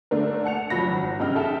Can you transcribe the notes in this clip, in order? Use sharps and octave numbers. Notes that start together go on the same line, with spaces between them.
D3 A3 D4 A#4
F#5 A5 C#7 F7
F#1 F3 F#3 B5 A#6
G#1
G2 C#3 D#4 G5 F6
G#4 A4 E5 G5 A5